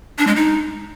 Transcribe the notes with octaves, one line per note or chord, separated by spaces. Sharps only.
D4
G#3
D#4